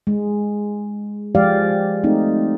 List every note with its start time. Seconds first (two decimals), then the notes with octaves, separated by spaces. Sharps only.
0.07 G#3
1.35 F3 G#3 G4 D5 F5
2.03 A3 C4 D#4